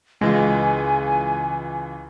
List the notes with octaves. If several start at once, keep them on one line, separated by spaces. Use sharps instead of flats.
C#2 E3 G#3 F4 G#5